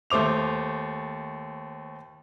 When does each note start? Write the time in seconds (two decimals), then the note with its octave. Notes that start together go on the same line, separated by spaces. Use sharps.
0.10 D#2 A3 C5 D6 F7